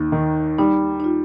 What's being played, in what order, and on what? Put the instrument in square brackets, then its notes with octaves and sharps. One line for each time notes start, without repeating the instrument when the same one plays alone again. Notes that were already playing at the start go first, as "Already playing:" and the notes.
Already playing: [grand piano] D#2 [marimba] D#4
[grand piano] D#3
[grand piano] G3 [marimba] D#4
[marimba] D#4
F4